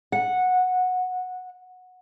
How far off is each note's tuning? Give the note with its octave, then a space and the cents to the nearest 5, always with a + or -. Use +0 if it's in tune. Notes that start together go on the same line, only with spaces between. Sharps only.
F#5 -15